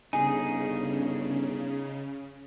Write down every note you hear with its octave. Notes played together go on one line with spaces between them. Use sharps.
G1 C#3 D#4 G#4 G#5